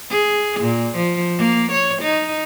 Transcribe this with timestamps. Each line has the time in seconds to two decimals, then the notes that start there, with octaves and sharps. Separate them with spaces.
0.10 G#4
0.61 A#2
0.96 F3
1.38 A#3
1.72 C#5
2.02 D#4